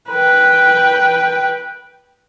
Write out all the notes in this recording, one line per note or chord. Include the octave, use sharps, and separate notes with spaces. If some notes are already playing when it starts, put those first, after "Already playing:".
B4 G5